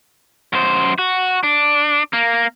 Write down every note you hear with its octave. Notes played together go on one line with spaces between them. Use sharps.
F#2 C5
F#4
D4
A#3